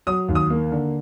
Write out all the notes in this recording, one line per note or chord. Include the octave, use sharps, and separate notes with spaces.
F#3 D#6
D#2
D#6
A#3
D3